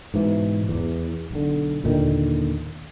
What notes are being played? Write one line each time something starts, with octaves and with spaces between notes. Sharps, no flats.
G#2 B2 E3
E2
B1 D3
D#2 A#2 D3 D#3